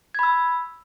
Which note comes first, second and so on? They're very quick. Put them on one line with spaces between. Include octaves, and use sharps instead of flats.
G#6 B5 E6